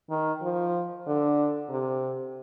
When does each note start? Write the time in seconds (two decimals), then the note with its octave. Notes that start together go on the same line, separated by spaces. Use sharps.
0.10 D#3
0.42 F3
1.07 D3
1.69 C3